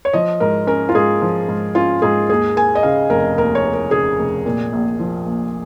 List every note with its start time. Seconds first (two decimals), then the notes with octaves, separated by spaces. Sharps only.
0.05 C#5
0.13 F3 D#5
0.40 G#2 A#4
0.67 C#4 A#4
0.89 F4
0.95 G#2 G#4
1.22 F3
1.48 G#2
1.75 C#4 F4
2.02 G#2 G#4
2.30 D#2 G#4
2.56 A#3 G#5
2.75 D#5
2.83 C#3 F5
3.10 F1 A#4
3.38 D#2 A#4
3.55 C#5
3.64 A#3
3.73 A#4
3.91 C#3 G#4
4.19 F1
4.45 A#2
4.73 A#1
5.00 F3
5.26 A#1